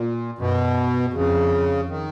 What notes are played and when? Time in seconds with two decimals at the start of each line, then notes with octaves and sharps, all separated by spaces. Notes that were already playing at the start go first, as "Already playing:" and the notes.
Already playing: A#2
0.38 F#2 B2
1.13 F2 C#3
1.89 D#3